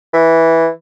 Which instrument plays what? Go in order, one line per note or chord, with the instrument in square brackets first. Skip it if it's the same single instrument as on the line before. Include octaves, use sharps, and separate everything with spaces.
[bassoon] E3